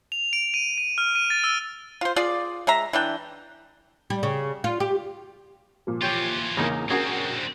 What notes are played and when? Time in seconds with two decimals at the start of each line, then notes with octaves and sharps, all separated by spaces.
0.12 F7
0.33 D7
0.54 D#7
0.78 D#7
0.98 F6
1.15 D#7
1.30 A6
1.44 E6
2.01 F4 C5
2.16 F4 G#4 D5
2.67 G#3 E5 A#5
2.93 E3 D4 G5
4.10 G3
4.23 C#3
4.64 F4
4.80 G4
5.87 A#2 F3
6.02 E3 F4 G4 C#5 G5
6.57 E2 C#3 A#3 D#4 G#5
6.90 D3 C4 C#4 F#4 G#4 A#4